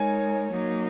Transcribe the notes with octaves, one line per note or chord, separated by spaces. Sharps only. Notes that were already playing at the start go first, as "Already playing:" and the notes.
Already playing: G#3 D#4 A#4 C#5 G#5
F#3 A#3 D#4